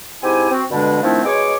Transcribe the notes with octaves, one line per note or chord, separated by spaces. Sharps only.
G#2 C4 E4 G4 G#5
C4 F#4
G2 B2 D3 G#3 D4
D#3 F3 A3 C4 D4 E4
B2 G#3 G#4 C#5 D6